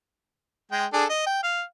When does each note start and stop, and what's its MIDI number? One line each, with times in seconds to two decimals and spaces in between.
0.72 0.85 56
0.72 0.85 79
0.93 1.04 62
0.93 1.04 68
0.93 1.04 69
1.09 1.25 75
1.26 1.42 79
1.43 1.62 77